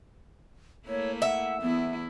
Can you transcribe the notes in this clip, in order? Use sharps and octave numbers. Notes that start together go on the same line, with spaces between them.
A3 A#3 E4 C#5
E5 F#5
E2 B3 E4